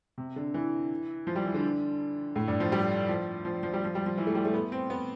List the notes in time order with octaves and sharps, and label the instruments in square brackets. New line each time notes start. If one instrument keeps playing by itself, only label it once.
[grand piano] C3
D3
E3
F3
G3
E3
D3
A2
G2
F3
G3
F3
F3
F3
G3
F3
G3
F3
E3
A3
G3
A3
B3
C4
B3